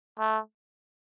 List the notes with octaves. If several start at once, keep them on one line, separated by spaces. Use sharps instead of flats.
A3